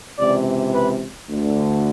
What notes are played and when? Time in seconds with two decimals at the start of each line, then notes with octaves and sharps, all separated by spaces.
0.18 C#2 C3 E3 D5
0.74 B4
1.29 D2 D3